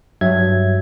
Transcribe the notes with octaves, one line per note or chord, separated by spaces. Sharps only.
G2 F#3 E5 G#6